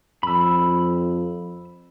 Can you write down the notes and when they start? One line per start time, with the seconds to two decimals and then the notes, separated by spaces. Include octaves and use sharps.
0.23 F2 B5 E6